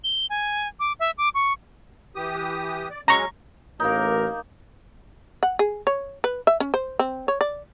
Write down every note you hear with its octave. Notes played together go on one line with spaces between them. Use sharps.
G7
G#5
D6
E5
D6
C#6
E3 G4 D#6
D5
F#3 G#3 C#4 A#5 C#6
A1 A#3 D#4 A#4
F#5
G#4
C#5
B4
E5
C#4
C5
C4
C#5
D5